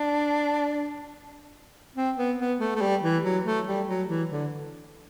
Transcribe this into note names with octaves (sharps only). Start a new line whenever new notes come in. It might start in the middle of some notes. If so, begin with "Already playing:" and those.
Already playing: D4
C4
B3
B3
A3
A3
G3
E3
F#3
A3
G3
F#3
E3
D3